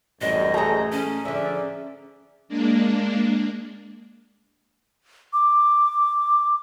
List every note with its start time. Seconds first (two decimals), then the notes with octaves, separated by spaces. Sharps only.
0.21 A1 F#2 G3 C4 D4 D#5
0.54 A3 G#4 A4 A#5
0.92 C#4
1.25 D3 F3 D5 E5
2.48 G#3 A#3 D4
5.33 D6